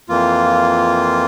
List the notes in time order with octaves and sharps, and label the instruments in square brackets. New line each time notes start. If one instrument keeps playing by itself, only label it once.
[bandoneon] F2 E3 A#3 F4